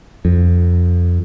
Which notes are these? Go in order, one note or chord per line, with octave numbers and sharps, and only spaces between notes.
F2